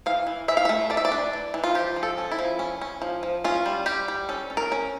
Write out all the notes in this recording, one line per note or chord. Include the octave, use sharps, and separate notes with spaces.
E3 F5
E3
E3 E5
F5
A3 E5
A3 D5
E5
D5
D4
E3
E3
F4
F3 G4
F3
A4
C#4
E4
F3
C#4
C#4
F3
F3
C#4 F4
G3
G3 G4
G3
C#4 A4
C#4
A#4
C#4